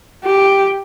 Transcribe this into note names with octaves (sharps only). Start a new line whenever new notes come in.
G4